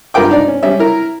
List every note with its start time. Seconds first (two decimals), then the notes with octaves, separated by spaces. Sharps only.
0.14 G2 F4 A#4 B4 G5 D6
0.30 D4 D#4 D5
0.48 C#4
0.63 G3 C#4 E5
0.80 E4 A#4